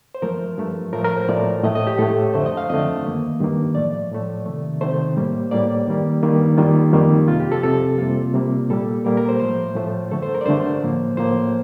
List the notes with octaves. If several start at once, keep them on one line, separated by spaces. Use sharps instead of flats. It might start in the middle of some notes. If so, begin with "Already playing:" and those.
C5
G2 F3 A3 A#4
G2 F3 A3
A2 F3 A3 A#4
A#4
C5
A2 F3 A3 D5
A2 A3 D#5
D#5
G4
A2 A3 A4
F2 D3 A3 C5
D#5
F5
F2 D3 A3 D#5
G2 D#3 A#3
G2 D#3 A#3
A2 F3 A3 D5
A2 F3 A3
C3 D#3 A3
C3 D#3 A3 C5
A2 G3 A#3
A2 G3 A#3 D5
G2 D#3 G3 A#3
G2 D#3 G3 A#3
F2 D#3 G3 A#3 F4
F2 D#3 G3 A#3
F2 C3 F3 F4
G4
A4
F2 C3 F3 A4
C3 G3 A#3 F4
C3 G3 A#3
A#2 G3 A#3 A4
A#2 G3 A#3 A#4
A#4
C5
A2 F3 A3 C5
A2 F3 A3
G2 D3 A3 A4
C5
A#4
D5
G2 D3 A3 C5
A2 F3 A#3
A2 F3 A#3 C5